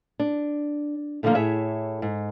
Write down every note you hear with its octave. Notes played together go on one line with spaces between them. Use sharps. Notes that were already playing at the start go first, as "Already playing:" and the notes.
D4
A2 D3 D#3 F3 A#3
A2 G#4 C#5 E5
G#2